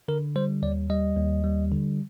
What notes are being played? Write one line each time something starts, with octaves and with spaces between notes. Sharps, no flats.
D3 A#4
G3 C5
D#2 D5
G3 D#5
D#2
G3
D3